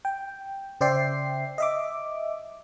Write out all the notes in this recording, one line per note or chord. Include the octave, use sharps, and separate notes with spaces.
G5
C#3 C5 D5 E5 G5 C7
D#5 E5 D6